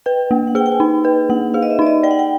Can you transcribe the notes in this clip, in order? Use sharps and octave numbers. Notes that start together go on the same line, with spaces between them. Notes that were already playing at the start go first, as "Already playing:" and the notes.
B4 G5
A#3
F#5
G#4 G5
G5
G#5
D#4
B4 G5
A#3 F#5
G#4 F5
D#5
E5
D#4 D5
D#5
D5 G5
F#5
G5